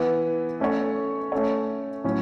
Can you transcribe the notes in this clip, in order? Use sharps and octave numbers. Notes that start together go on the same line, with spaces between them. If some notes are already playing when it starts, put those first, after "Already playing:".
Already playing: E3 B3 E4
A3 C#4 A4 C#5
A3 C#4 A4 C#5
A2 F#3 C#4